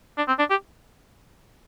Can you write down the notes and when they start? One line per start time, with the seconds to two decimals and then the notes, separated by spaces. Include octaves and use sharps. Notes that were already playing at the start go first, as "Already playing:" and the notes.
0.17 D4
0.28 C4
0.39 D4
0.50 G4